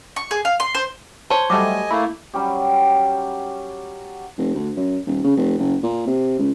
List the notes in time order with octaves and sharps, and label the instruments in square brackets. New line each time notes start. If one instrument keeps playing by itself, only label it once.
[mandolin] C#6
G#4
F5
C6
C5
[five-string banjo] C5 C#5 [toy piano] A5
[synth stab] F#3 G3 A3 [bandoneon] D#5 G#5 [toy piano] D6
[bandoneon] A3 A#3 [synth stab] E4
[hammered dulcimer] F#3 G3 C#4 G4
[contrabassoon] F1
D2
F#2
D#1
C#3
F1
F#1
A#2
C3
C#2